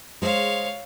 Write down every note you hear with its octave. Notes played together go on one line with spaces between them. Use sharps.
G#3 C5 C#5 F5